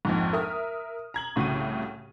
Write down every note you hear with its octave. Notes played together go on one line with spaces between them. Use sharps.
A#1 F2 G#2
A#4 E5 D#6 F6
A#5 G#6 F#7
C2 A2 C#3 F#4 D#7